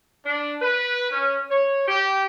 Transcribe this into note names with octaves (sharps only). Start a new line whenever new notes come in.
D4
B4
C#4
C#5
G4